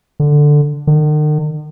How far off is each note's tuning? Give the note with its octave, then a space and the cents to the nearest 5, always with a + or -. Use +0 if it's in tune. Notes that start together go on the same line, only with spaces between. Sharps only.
D3 +5
D#3 -45